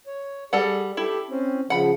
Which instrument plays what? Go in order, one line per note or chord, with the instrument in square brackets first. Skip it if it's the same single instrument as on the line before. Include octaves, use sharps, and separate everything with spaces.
[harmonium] C#5
[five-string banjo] G3 A4 F#5 [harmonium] G#4
[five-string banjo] E4 [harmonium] G4 A4
[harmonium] C4 C#4
[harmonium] C#3 F3 [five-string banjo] F#5 B5